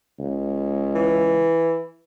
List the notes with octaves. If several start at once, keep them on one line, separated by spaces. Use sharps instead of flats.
C#2
E3